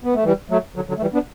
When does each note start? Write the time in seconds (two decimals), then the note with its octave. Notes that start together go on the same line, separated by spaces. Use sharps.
0.04 B3
0.14 A3
0.24 E3 G3
0.50 F#3 A3
0.76 D3 F#3
0.89 D3 F#3
0.97 A3
1.01 E3 G3
1.13 B3 D4